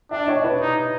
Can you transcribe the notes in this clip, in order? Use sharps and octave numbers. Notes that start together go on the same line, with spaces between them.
D4 D5 E5
C#5 D#5
B4 C#5
D#4